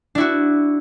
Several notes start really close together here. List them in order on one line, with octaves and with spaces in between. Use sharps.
D4 E4 F#4